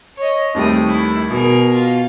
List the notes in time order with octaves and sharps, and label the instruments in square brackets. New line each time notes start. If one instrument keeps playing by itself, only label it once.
[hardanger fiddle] C#5 D#5
[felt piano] D#2 G3 A3 [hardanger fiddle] C4 D#6
[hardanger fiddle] E4
[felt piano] B2 [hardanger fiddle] G#4 A#4
[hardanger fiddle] F4